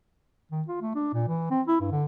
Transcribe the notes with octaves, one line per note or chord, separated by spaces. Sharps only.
D#3
F4
A3
D4
A#2
E3
C4
E4
G2
D3